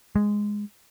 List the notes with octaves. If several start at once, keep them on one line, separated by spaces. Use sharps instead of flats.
G#3